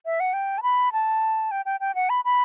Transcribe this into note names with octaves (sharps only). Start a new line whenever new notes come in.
E5
F#5
G5
A5
B5
A5
G5
G5
G5
F#5
B5
B5